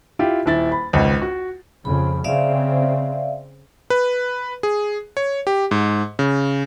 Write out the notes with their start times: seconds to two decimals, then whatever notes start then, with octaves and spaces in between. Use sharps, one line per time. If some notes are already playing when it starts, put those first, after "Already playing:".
0.19 E4 F4 G4
0.46 D#1 E4 A6
0.72 B5
0.93 G#1 C#2
1.22 F#4
1.85 F2 C#3 B5
2.24 C#3 C4 D5 E5 F5
3.90 B4
4.63 G#4
5.17 C#5
5.47 G4
5.71 G#2
6.19 C#3